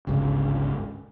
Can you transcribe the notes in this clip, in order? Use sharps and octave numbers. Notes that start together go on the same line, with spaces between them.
G1 C#2 G#2 C#3